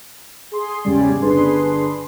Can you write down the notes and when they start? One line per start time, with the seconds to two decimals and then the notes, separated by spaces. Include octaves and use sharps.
0.51 G#4 C6
0.84 E2 G#2 C#3 G3 D5 G#5
1.21 G1 D4 G#4 B4 C6